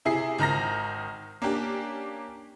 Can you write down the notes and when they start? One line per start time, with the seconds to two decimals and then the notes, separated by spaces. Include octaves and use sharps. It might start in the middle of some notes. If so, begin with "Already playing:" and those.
0.05 C3 E4 G#4 C7
0.39 G#1 D#3 A#5 A#6
1.42 A#3 C#4 D4 G4